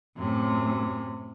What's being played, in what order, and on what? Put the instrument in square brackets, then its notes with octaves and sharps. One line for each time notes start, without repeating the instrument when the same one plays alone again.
[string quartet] F#2 A2 C3